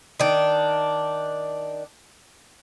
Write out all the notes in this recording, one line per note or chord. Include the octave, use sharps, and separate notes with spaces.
D#3 D4